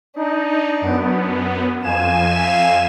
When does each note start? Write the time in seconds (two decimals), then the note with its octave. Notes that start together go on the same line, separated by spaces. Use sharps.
0.16 D4 D#4
0.81 F#2 B3
1.83 F2 F5 G#5 E7
2.33 E5 F5